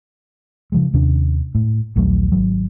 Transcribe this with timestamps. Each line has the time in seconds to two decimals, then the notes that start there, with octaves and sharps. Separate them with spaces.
0.72 C#3 F3 G#3
0.93 D#2 C3 C#4 D4
1.55 A2
1.96 A#1 D#2 F#3 A3
2.32 G#1 F#3